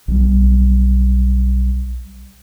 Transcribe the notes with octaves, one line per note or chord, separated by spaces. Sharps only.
B1 G3